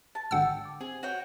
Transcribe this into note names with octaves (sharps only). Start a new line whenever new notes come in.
A5
G#1 G#2 D3 F#5 G5 E6
D6
C4 G#4
F#4 C#5 G5